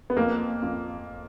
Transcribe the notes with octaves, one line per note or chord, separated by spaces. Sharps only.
B3
F2 A#3
F2